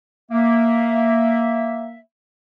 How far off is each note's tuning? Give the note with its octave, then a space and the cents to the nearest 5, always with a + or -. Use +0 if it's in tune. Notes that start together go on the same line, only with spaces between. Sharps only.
A#3 +0 E5 +0